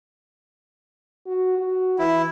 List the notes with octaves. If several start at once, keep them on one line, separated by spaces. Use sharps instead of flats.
F#4
F#4
E3 E4